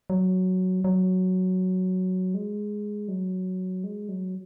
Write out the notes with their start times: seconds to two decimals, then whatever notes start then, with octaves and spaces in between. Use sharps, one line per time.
0.10 F#3
0.84 F#3
2.34 G#3
3.08 F#3
3.84 G#3
4.09 F#3